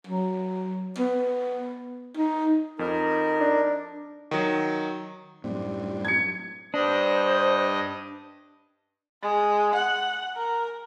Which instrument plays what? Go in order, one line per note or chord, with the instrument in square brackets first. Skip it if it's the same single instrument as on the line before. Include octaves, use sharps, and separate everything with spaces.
[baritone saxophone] F#3
B3
D#4
[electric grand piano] F2 [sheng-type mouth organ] D#4 A#4
[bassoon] D4
[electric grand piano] D#3 F#3
[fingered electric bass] F#2 A2 [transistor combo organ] G3 C4 D4
[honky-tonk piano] G#6 C#7
[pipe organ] G2 D#5 [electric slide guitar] D4 [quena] C5
[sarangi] G#3
F#5
A#4